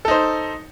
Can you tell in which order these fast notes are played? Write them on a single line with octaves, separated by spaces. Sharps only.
A4 D#4 C5